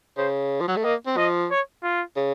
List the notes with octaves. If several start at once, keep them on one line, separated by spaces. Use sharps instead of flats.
C#3 C5
F3
F#3
A3
A#3 D#5
C4
F3 D#5
C#5
F4
C#3